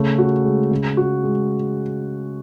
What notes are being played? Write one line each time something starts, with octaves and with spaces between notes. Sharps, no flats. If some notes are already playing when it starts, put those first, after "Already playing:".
Already playing: C#3 A3
F#4
G#3
C#3
F#4
G#3